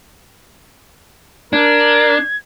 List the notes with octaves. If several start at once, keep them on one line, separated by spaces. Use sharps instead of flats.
D4 A#4 G#6